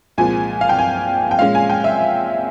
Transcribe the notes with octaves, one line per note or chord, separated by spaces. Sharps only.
C2 A#2 F3 G#3 G#5
F5
G5
G#5
G5
A#2 G#3 C#4 F5
G#5
G5
E5